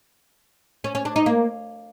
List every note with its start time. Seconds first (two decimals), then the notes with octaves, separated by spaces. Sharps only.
0.84 C#4
0.95 C#4
1.05 D4
1.16 D#4
1.26 A#3